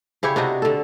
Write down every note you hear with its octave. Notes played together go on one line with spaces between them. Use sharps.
C#3 E4 G4 C#5
C3 D4 F#4 D#5
D3 A4